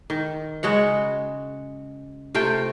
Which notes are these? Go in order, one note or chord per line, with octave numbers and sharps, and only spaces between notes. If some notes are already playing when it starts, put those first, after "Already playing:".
D#3
C#3 G#3 F#4 F#5
C3 A3 F4 G5